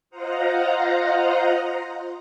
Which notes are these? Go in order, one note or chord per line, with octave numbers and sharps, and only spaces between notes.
F4 C5 D#5 F5 F#5 A#5